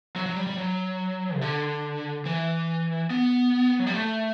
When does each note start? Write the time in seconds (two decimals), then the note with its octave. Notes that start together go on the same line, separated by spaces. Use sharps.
0.16 F#3
0.26 F#3
0.37 G3
0.47 G3
0.58 F#3
1.36 C3
1.41 D3
2.26 E3
3.10 B3
3.79 F#3
3.87 G3
3.94 A3